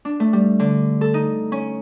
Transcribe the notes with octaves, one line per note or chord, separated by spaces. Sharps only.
D4
A3
G3
D3
A4
D#4
C#4